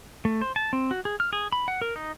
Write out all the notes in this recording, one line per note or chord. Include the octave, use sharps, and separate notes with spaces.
A3
C5
A5
C4
F#4
G#4
F6
G#4
B5
F#5
A#4
D#4